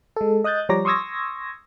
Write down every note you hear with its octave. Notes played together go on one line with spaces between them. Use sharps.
G#3 A4
D#5 D#6 F#6 G6 A6
F3 G3 C#5 A#5 D6 A#6
C6 C#6 D#6 E6 G#6 A#6